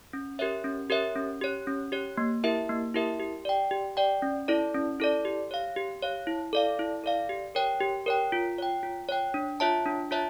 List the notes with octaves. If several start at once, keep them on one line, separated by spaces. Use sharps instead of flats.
C#4
G4 A#4 C#5 E5
C#4
G4 A#4 C#5 E5
C#4
G4 C#5
C#4
G4 C#5
A#3
E4 G4 A#4 E5
A#3
E4 G4 A#4 E5
G4
D5 G5
G4
D5 G5
C#4
E4 A4 D5
C#4
E4 A4 D5
G4
C#5 F5
G4
C#5 F5
E4
A4 D5 F5
E4
A4 D5 F5
G4
A#4 C#5 G5
G4
A#4 C#5 G5
F4
C#5 G5
F4
C#5 G5
D4
F4 C#5 E5 A5
D4
F4 C#5 E5 A5